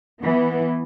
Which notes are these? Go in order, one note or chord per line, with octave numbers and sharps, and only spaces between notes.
E3 B3